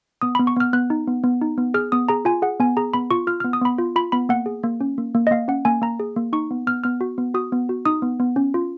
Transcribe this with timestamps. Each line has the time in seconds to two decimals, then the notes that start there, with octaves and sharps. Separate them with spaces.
0.22 B3 D#6
0.35 B5
0.39 B3
0.47 C#6
0.56 B3 F6
0.73 B3 F#6
0.90 D#4
1.08 B3
1.24 B3
1.42 D#4
1.58 B3
1.74 G#4 F6
1.92 B3 D#6
2.09 G#4 A#5
2.25 F4 G#5
2.42 G#4 F#5
2.60 B3 G#5
2.77 G#4 A#5
2.94 B3 B5
3.11 F4 C#6
3.27 F4 F6
3.40 F6
3.44 B3
3.53 D#6
3.61 B3 B5
3.78 F4
3.96 F4 B5
4.12 B3 B5
4.29 A#3 F#5
4.46 G#4
4.63 A#3
4.81 C#4
4.98 A#3
5.15 A#3
5.27 D#5
5.31 A#3 F5
5.48 C#4 F#5
5.65 A#3 G#5
5.82 A#3 A#5
6.00 G#4
6.16 A#3
6.33 D#4 C#6
6.51 B3
6.67 B3 F6
6.84 B3 F6
7.01 F#4
7.18 B3
7.34 F#4 D#6
7.52 B3
7.69 F#4
7.86 D#4 D#6
8.02 B3
8.20 B3
8.36 C#4
8.54 F4